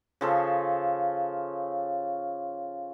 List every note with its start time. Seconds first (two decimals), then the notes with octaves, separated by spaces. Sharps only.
0.21 C#3 F3 A4